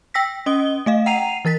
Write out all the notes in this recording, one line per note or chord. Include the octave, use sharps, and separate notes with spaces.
G5 E6 A#6 B6
C#4 D#5 D#6 G7
A3 D#5 F5
F#5 G5 A#5 C7 D#7 F7
E3 A#4 A6 B6